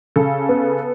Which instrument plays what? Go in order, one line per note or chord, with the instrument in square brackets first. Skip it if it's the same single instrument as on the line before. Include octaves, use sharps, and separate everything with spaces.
[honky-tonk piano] C#3 A4
B3